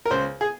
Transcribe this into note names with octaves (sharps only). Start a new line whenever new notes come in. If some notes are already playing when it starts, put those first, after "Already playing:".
A#4
C#2 C5
G#4